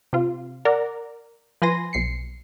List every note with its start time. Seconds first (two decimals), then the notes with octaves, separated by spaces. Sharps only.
0.13 C3 F4
0.65 A#4 D5 F#5 A#5
1.62 F3 B4 G#5 C6 A#6 D#7
1.93 B1 C7 C#7